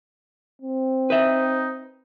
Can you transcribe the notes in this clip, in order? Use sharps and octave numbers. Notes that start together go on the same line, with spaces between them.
C4
D#4 B4 E5